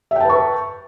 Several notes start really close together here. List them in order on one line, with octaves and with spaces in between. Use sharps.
E5 G5 A5 B4 C#6